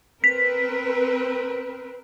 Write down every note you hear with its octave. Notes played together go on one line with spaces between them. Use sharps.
C4 A#4 B4 B6